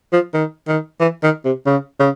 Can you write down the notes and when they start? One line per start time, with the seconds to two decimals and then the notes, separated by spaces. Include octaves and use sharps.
0.13 F3
0.34 D#3
0.68 D#3
1.00 E3
1.23 D#3
1.45 C3
1.66 C#3
1.99 C#3